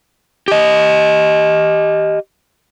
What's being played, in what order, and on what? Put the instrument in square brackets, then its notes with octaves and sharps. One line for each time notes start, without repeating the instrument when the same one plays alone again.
[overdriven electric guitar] G4 D#5